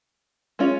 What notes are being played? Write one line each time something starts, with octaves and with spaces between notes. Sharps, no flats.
G#3 C#4 F4